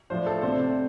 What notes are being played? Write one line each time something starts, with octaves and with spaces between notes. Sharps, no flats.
A2 F3 D4 C5
A4
C3 A3 D4 C5